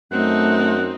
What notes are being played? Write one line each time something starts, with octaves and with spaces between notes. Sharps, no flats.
F#2 A3 C4 D#4 F#5